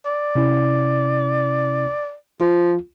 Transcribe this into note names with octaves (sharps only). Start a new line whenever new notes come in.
D5
C3 C#4 E4
F3 F4